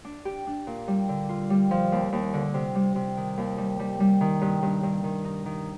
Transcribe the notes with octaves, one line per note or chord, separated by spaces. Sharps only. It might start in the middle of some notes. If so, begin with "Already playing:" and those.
D4
G4
D4
A#2
G3
D3
F4
G3
F3
D#2
D#2
D3
C3
G3
C3
D#3
D#2
G3
G3
G3
D#3
G2
G2
G2
D#3
D#4
D#3